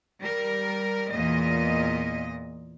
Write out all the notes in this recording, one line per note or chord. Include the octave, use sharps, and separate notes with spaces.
G3 A#4
E2 A#2 D#5